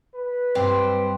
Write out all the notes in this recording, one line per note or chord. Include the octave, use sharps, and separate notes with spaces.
B4
G2 C4 G4